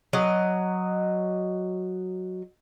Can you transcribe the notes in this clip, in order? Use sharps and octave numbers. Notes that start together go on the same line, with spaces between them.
F#3 D#5